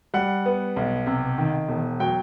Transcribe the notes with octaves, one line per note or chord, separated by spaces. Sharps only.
G3 F#5
B3
B1
C3
D#3
E1
F#3 G5